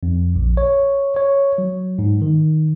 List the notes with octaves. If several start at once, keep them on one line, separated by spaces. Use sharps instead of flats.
F2
A#1
C#5
C#5
F#3
G#2
D#3